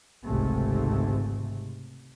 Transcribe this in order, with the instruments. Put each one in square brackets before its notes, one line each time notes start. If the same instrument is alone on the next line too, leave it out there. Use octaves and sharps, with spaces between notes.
[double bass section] G#1 C#2 G#2 C3 G#3 A3